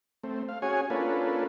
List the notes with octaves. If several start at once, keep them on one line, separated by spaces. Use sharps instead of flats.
A3 C4
F5
C#4 F#4 G#4 C#5 G#5
A#3 C#4 D4 F4 A4 B4